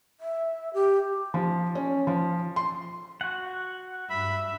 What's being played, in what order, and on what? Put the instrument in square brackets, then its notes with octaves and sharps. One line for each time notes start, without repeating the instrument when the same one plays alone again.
[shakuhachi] E5
G4
[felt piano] F3
C#4
F3
C6
[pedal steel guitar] F#4 F#5
[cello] G2 [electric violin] E5 [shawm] B5